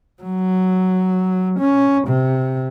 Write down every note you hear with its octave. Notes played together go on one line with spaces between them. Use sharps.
F#3
C#4
C3